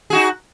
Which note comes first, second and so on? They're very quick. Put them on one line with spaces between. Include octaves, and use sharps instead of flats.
G#4 F#4 D#4